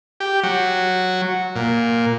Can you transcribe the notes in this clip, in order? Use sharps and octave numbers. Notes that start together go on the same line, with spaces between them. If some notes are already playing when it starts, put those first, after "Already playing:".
G4
F#3
A#2